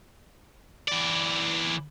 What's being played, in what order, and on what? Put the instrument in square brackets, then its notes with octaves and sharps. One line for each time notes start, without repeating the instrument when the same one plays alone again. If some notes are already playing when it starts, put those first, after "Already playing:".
[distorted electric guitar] E3 D5